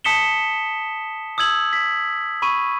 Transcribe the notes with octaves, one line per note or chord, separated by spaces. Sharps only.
A5 D#6 B6 C#7 E7 G7
D#6 E6 G#6 F#7
B6
B5 C#6 D#7